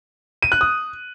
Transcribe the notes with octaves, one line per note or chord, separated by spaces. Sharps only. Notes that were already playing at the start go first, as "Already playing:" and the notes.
D#7
F#6
D#6